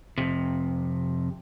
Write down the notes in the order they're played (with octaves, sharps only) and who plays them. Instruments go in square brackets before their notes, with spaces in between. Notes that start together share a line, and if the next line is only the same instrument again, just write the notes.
[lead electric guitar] F2 C3